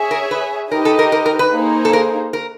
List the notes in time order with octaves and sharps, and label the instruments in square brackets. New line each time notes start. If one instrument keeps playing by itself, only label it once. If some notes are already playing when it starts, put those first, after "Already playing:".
Already playing: [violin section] G#4 C#5 E5 G#5
[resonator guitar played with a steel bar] A#4
B4
[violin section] D#4 G4 B4 D#5 [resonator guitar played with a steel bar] A#4
[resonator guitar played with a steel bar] A4
A#4
A#4
A#4
B4
[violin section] A#3 D#4 G#4 C5
[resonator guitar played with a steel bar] A4
A#4
A#4